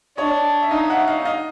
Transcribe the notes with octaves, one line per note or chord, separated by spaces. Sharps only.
D4 C#5 D#5
E5
D#4 D#5 F5
E5 F#5
D#5 F5
D#5 F5